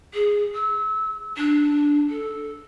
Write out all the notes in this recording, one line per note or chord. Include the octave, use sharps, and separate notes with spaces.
G#4
E6
D4
A4